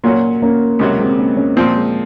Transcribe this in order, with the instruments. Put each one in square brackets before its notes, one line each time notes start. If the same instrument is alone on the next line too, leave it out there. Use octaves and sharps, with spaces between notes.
[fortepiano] A#2 F#3 C#4 F#4 [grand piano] A#3
[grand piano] A#3 C#4
[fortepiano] C#2 C3 F#3 [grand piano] A#3
[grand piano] G#3 C4
A#3 C#4
A#3 C#4
[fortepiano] A#2 F3 C4 [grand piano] A#3
[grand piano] G#3